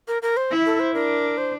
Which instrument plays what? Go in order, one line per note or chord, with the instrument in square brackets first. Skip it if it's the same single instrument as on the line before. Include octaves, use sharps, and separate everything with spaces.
[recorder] A#4
A#4
C5
[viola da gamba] E4
[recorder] A4
C5
[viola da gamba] D4 [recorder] A#4
[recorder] C5